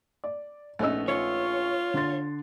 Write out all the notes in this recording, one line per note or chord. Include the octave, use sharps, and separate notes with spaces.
D5
A#1 A3 B3 C#4 D#4 E6
F4 C#5
D3 C6 A6